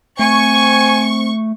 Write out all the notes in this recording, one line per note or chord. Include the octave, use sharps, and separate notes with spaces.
A3 C4 G#5 C#6